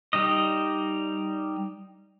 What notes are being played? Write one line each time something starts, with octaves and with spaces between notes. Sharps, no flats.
G3 D#4 D#5